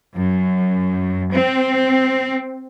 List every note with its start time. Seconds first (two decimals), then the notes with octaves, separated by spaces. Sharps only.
0.16 F#2
1.32 C4